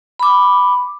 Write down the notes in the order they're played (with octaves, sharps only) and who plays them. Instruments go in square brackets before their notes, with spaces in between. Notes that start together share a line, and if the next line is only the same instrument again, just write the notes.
[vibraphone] B5 D6